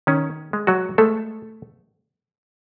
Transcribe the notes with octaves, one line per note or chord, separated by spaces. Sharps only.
D#3 C#4
G#3
F#3 F#4
G#3 A3 A4